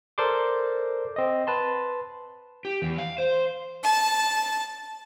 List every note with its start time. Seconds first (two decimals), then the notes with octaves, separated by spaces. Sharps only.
0.18 A4 A#4 C5 D5 C6 D6
1.16 C4 D#5
1.47 B4 A5 C6
2.65 G4
2.82 E2
2.98 F5
3.18 C5
3.82 A5